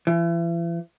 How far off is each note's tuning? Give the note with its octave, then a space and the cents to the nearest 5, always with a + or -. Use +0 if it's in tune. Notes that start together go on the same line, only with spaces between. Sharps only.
E3 +40